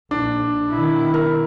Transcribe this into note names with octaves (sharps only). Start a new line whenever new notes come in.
A#1 D4
B2 D#3 E4
A#4